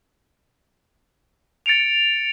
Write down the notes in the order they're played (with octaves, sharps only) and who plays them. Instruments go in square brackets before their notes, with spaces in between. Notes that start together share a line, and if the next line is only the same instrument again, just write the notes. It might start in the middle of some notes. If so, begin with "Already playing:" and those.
[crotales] A6 C#7 D7 F7